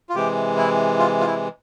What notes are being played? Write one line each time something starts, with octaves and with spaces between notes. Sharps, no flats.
F4
C3 E3 G#3 G4
E4
F4
F4
E4